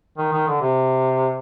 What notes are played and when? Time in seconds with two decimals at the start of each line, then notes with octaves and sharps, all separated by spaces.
0.18 D#3
0.33 D#3
0.48 D3
0.61 C3